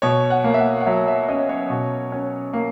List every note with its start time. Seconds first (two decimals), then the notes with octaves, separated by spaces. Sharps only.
0.02 B2 C#5
0.30 F#5
0.44 A#3
0.54 E5
0.59 F#5
0.80 F#5
0.86 F#3 E5
1.08 E5
1.28 C#4 D#5
1.49 C#5
1.70 B2
2.12 C#4
2.53 A#3